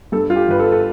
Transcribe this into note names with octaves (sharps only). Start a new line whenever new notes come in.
G2 A4
F4
G4
G1 B4
A4
A4